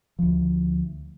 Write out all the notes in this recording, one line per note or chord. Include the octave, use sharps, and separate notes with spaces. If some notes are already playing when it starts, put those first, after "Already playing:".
D2 F3